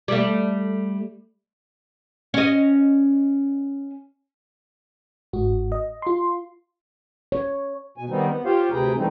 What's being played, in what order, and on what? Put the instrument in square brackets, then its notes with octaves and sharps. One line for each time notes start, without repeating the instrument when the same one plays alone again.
[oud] G3 A3
C#4 D#5
[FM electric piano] G1 G#2 F#4
D#5
F4 C6
[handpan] C#5
[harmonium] B2 G#5
D#3 G3 B3 C4 D#4
B3
F4 G4 C5 C#5 F5
D2 C3 G#4 B4 G5 A#5
D#3 E3 G3 A3 C4 D#4